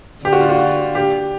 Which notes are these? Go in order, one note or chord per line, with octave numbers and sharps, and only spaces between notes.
D3 G4
F#4
F4
F#4
G4